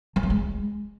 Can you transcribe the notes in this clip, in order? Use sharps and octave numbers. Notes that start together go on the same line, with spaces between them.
F#3
A#3
G#3